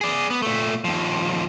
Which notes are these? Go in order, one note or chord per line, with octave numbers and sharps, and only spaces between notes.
G#4 D5
B3
A#2 A3
D#2 F3